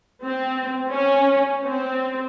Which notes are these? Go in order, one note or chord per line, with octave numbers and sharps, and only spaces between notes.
C4
C#4
C4